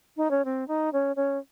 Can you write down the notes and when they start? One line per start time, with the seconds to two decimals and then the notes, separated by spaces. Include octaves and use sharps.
0.17 D#4
0.31 C#4
0.45 C4
0.68 D#4
0.93 C#4
1.16 C#4